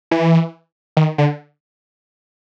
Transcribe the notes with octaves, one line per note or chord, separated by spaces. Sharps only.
E3
D#3
D3